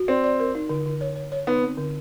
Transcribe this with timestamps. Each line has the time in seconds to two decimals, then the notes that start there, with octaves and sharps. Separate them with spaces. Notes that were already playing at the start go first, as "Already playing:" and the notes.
Already playing: F#4
0.08 C4 D5
0.24 D5
0.40 A#4
0.55 D#4
0.69 D3
0.86 D3
1.01 C#5
1.16 C#5
1.32 C#5
1.47 B3 D#4
1.62 C4
1.78 D3